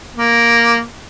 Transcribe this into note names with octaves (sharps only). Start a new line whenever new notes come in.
A#3